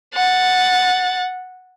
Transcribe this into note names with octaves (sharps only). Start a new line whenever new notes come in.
F#5 A6